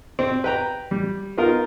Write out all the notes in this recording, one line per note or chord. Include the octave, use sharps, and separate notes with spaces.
C4
B4 G5 A#5
G3
B3 D#4 F4 A#4